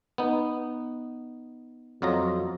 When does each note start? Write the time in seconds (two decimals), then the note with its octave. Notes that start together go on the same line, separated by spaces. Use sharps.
0.18 B3 D#4
2.02 F2 F#3 F4 D#5 A#5